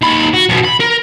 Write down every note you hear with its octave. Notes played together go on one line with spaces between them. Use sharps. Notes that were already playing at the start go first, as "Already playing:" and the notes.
D#2 B5
F#4
F#2 B2
B5
A#4